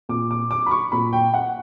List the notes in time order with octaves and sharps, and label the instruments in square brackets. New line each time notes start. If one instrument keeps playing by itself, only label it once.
[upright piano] A#2 D6
D6
D6
B5
C#6
A#2 B5
G5
F#5